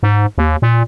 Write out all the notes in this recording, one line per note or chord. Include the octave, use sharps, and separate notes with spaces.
G#2
D#2
A#2